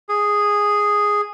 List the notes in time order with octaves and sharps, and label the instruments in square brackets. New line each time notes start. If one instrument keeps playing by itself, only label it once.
[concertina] G#4